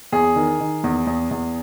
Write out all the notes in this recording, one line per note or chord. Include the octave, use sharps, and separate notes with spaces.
E2 G#4
D#3
D#3
E2
E2
E2